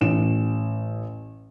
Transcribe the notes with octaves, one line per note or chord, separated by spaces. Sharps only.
A1 E7